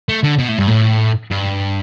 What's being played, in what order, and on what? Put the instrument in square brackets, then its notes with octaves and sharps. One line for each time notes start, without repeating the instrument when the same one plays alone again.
[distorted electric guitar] A3
D3
B2
A2
G2
A2
G2